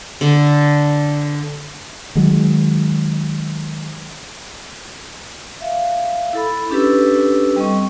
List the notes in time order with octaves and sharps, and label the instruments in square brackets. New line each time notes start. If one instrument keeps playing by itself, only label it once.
[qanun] D3
[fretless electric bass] D#3 F#3 G#3
[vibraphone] E5 F5
E4 A4 B5
C#4 D4 G4 A4 B4 E6
G3 C4 D#5 C#6